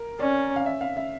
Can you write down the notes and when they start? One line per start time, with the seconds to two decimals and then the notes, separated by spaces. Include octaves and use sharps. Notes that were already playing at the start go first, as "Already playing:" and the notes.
Already playing: A#4
0.20 C#4 D5
0.56 F5
0.66 E5
0.81 F5
0.97 E5